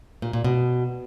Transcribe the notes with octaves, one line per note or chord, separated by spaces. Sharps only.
A#2
A#2
B2